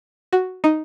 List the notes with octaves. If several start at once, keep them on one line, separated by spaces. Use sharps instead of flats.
F#4
D#4